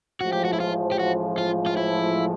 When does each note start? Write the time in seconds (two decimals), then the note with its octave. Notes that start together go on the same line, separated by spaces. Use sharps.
0.21 A1 A2 F3 G#3 F#4
0.33 G4
0.45 F#4
0.53 E4
0.60 F4
0.92 G4
0.99 F#4
1.38 F4
1.66 F4
1.77 E4